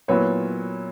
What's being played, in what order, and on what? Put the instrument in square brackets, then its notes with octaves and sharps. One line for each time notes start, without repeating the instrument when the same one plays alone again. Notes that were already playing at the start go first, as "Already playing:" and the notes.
[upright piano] A#2 F#3 B3 E4 B4 C#5